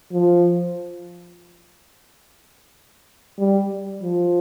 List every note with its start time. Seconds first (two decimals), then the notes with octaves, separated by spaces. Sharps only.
0.12 F3
3.38 G3
4.02 F3